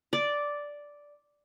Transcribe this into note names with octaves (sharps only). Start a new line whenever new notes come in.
D5